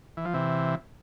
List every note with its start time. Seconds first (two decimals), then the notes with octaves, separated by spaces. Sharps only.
0.17 E3
0.25 F3
0.34 C3 E3